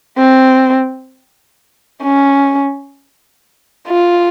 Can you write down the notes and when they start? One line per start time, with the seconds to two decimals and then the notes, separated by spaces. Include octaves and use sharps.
0.18 C4
2.03 C#4
3.88 F4